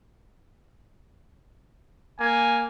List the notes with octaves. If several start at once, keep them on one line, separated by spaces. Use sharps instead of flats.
A#3 G#5